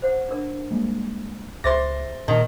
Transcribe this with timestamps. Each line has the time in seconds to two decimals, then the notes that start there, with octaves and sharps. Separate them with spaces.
0.02 C5 F#5
0.29 D4 A#4
0.71 G3 G#3 A#3
1.64 C#2 G#4 C5 E5 C6 A6 A#6
2.28 A#2 D#3